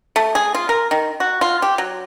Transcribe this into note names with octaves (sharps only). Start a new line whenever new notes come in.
A3
G#4
F4
A#4
D#3
F#4
F4
G4
F#3